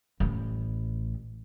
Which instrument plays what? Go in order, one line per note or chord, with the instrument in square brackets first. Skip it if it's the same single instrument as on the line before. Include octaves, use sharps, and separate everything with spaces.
[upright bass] A1 A2